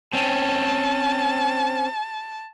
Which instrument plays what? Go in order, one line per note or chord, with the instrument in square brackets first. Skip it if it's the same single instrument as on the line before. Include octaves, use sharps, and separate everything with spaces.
[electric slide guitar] C4 C#4 [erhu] A5